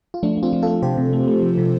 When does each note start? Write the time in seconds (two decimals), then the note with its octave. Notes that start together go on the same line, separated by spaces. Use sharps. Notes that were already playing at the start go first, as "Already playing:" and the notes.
0.14 F4
0.23 F3 A3 D4
0.37 A3
0.43 C4 F4
0.53 F3
0.63 A3 F4 A4
0.82 C3 G4 C5
0.97 C3
1.13 A3
1.28 A3
1.42 F3
1.58 C3